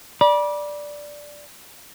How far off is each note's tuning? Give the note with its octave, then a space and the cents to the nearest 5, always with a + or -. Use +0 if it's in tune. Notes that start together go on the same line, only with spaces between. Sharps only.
D5 +0 B5 -35